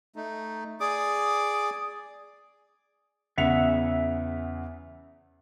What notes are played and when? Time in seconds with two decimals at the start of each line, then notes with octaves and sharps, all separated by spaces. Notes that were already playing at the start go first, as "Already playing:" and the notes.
0.16 A3 D#4
0.80 G#4 D5 D6 D#6
3.38 E2 C#3 E5 F#5 F7